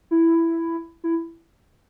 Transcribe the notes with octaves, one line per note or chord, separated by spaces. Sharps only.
E4
E4